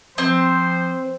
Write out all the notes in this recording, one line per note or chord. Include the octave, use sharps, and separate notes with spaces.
F3 C4 C5